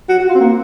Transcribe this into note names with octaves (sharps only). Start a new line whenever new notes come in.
F#4
F#4
F4
C4
A#3